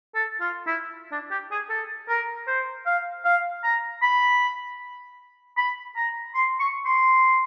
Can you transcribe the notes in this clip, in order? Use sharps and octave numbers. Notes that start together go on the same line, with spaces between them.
A4
F4
E4
D4
G4
G#4
A4
A#4
C5
F5
F5
A#5
B5
B5
A#5
C6
C#6
C6